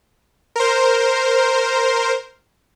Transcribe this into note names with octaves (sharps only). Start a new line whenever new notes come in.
A#4 C5